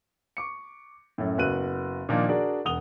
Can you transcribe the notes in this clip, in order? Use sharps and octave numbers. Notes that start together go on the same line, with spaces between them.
C#6 D6 C#7
F#2 A2
F#1 B3 F#4 F#6 D#7
A#2 D#3 F3 A#3 D4 D#4
D4 F#4 G#4 A#4 D5
E1 F#5 D#6 F7 G7